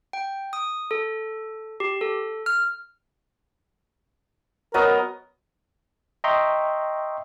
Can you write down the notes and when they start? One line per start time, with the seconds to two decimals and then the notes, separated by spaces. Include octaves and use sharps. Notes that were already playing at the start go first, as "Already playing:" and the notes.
0.13 G5
0.53 D#6
0.91 A4
1.80 G4
2.01 A4
2.46 F6
4.74 F#3 B3 A#4 D#5
6.24 D#5 E5 G5 A#5 C6 C#6